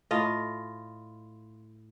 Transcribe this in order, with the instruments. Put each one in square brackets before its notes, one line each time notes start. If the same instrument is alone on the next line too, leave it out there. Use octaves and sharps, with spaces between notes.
[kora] A2 F4 D#5